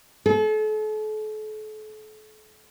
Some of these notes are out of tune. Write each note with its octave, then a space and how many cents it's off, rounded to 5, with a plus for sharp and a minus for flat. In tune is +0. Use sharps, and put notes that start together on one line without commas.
A4 -40